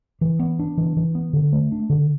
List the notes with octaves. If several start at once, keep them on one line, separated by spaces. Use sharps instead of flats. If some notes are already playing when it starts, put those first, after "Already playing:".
E3
B3
D4
E3
E3
B3
D3
A3
D4
D3